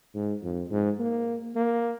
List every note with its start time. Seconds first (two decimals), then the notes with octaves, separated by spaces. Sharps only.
0.14 G#2
0.43 F2
0.71 G#2
0.99 A#3
1.55 A#3